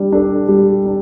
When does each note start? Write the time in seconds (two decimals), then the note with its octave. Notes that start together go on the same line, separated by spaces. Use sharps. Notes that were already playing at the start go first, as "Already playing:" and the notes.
Already playing: G3 D4
0.12 D4 A4
0.49 G3
0.86 D4